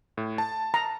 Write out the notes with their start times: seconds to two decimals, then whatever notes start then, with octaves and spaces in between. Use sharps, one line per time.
0.17 A2
0.38 A5
0.74 A#5